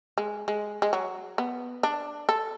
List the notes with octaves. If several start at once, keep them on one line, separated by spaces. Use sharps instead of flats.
G#3
G#3
G#3
F#3
B3
D4
A4